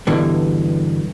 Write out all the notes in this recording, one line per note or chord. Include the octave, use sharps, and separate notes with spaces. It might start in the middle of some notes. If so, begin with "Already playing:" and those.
G2 B2 D3 E3